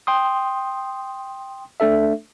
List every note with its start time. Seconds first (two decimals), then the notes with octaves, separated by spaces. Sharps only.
0.07 G5 C6 D#6
1.80 A3 D4 A4 E5